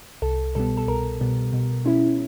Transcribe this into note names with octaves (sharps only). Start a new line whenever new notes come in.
C2 A4
B2 G3 B3 A4
A4
C2 A#4
B2 G3 B3
B2
G#3 C#4 E4